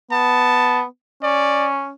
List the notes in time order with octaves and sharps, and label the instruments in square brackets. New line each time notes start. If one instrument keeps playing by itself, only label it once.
[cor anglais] B3 [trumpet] A5
[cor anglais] C#4 [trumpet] D5